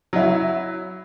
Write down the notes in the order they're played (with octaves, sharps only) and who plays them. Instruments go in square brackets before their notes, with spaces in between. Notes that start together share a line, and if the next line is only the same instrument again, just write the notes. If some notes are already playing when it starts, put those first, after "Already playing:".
[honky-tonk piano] F#3 E4